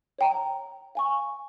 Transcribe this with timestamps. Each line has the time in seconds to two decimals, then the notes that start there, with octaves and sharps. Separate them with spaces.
0.19 C#5 G5 A#5
0.95 F5 G#5 C#6